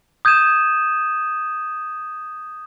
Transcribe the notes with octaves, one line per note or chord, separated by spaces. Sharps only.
D#6 G6 G#6 D#7 E7